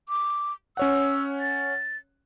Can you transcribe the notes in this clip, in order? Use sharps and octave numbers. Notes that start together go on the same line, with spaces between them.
D6
C#4 C#5 F#5 E6
A6